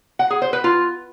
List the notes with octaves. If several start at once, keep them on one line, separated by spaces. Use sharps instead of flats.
F#5
G#4
C5
B4
F4